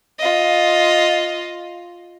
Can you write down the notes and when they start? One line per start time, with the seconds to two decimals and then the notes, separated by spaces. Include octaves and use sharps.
0.19 F4 D#5